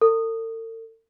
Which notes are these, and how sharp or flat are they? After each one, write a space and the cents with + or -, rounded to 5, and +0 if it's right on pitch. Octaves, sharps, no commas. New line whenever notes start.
A4 +45